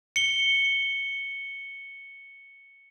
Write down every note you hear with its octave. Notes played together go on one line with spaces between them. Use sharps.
C#7 G7